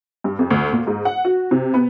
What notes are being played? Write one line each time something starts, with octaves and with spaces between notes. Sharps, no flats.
G2
F2
D2
A#2
G#2
F#5
F#4
C3
B3